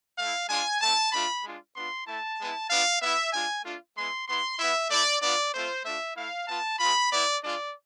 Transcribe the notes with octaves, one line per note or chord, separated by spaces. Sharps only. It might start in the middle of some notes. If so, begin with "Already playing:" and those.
A3 E4 F5
G#3 D4 F4 G#5
A3 C4 E4 A5
A3 D4 F4 B5
G#3 D4 F4
B3 D4 F4 C6
A3 E4 A5
G#3 B3 E4
B3 D4 F4 F5
B3 E4 E5
G#3 D4 F4 G#5
A3 D4 F4
G#3 B3 E4 C6
B3 E4 C6
B3 E4 E5
A3 E4 D5
B3 D4 F4 D5
A3 C4 F4 C5
A3 D4 F4 E5
A3 E4 F5
B3 F4 A5
G#3 C4 F4 B5
B3 E4 D5
G#3 D4 F4 D5